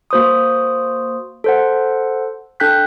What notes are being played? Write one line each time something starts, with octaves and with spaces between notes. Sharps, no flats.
A#3 F#4 C5 C6 D#6
A4 C5 F#5
D4 A4 G5 F#6 G6 B6